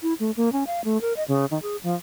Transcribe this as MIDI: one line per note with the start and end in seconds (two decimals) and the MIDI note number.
0.03 0.14 64
0.20 0.31 57
0.37 0.52 58
0.52 0.64 61
0.67 0.84 77
0.84 1.01 57
1.01 1.13 70
1.17 1.24 75
1.28 1.46 49
1.51 1.61 51
1.62 1.76 68
1.83 1.95 53